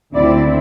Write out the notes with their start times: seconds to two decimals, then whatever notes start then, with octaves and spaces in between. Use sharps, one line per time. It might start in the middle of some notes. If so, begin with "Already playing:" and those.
0.14 D2 D3 C4 E4 D5